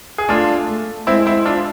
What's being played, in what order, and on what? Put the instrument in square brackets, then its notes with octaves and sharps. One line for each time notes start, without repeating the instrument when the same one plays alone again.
[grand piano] G#4
[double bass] A3 [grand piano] D4 F4
[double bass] A3
[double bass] G#3 [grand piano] C4 E4
[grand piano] C4 E4
D4 F4